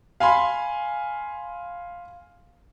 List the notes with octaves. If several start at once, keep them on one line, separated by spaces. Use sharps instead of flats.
F5 G#5 B5 C6